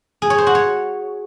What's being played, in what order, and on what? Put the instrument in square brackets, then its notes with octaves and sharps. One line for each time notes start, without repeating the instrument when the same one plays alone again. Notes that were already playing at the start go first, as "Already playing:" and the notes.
[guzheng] G#4
C#5
C5
F#4
C#5